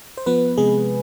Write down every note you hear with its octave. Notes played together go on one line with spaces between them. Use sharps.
C5
F3 B3 B4
C3 G#3 G#4